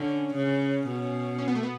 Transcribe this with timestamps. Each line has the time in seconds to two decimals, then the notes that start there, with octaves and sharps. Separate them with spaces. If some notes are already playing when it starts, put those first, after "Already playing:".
Already playing: D3 C#4
0.35 C#3
0.87 B2
1.38 C#4
1.48 B3
1.55 A3
1.63 B3